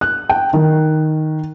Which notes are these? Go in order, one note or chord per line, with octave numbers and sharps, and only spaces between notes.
F#6
G5
D#3